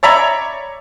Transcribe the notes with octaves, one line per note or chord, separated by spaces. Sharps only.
C#5 D5 E5 A#5 B5